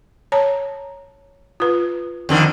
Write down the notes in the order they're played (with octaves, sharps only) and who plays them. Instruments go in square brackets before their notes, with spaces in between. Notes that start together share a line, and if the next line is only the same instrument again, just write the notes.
[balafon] C#5 A5 A#5
F4 B4
[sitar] F2 D3 D#3